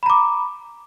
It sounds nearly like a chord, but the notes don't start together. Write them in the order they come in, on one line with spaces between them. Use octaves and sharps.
B5 A#5 D6